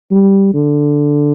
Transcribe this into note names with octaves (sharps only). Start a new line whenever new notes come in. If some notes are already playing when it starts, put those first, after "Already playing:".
G3
D3